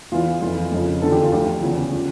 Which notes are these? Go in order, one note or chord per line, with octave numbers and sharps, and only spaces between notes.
E2 E3 F4
F2 E3 F4
F2 C#3 F3
E2 D3 F3 A4
G4
F4
D2 D3 F3 G4
E2 C#3 F3
C#3 F3